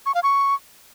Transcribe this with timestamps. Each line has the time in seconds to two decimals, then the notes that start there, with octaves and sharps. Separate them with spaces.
0.06 C#6
0.15 F5
0.23 C#6